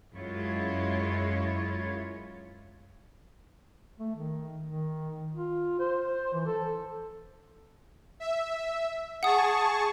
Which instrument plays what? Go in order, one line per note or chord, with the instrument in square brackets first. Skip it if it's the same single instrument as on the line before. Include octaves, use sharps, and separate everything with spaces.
[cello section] F#2 G#3 E4 F4 C#5
[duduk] A3
D#3
D#3
F4
C5
E3
A4
[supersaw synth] E5
[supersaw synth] G#4 A5 C#6 [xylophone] F#5 D#6